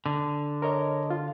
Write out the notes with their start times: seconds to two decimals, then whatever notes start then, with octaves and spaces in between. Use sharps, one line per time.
0.06 D3
0.62 A#4 C#5 D#5
1.10 F4